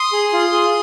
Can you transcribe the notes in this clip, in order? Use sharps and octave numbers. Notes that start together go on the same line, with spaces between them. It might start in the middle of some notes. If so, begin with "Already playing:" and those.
Already playing: C6 D#6
G#4
F4
G#4